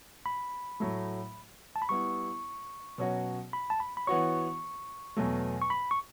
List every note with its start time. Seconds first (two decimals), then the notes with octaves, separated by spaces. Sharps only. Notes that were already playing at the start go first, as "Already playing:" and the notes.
0.26 B5
0.80 A2 F#3 A3
1.76 A5
1.82 B5
1.89 G3 B3 E4 C#6
2.98 B2 F#3 C#4 F#4 C#5
3.53 B5
3.70 A5
3.80 B5
3.97 B5
4.07 E3 B3 F#4 C#5 C#6
5.17 E2 B2 F#3 A3
5.62 C#6
5.70 B5
5.91 C#6